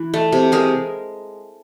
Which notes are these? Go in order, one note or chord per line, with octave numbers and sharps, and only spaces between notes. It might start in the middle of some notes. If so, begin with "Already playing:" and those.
Already playing: E3
A3
C3
G#3 G#4 A#4